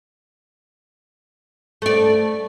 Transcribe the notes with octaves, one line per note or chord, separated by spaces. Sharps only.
A3 D5